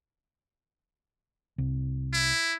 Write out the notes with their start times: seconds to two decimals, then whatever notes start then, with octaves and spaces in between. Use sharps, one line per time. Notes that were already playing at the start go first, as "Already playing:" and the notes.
1.58 C2
2.13 E4